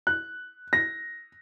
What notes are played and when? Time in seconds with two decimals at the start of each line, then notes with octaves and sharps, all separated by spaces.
0.07 F#6
0.73 A#6